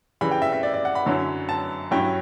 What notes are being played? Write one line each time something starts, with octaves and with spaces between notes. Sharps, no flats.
C#3 E3 G3 B5
G5
E5
E5
D5
D5
F#5
B5
F#2 D3 F#3 C#4 E4
A5
G2 F#3 C#4 E4 G5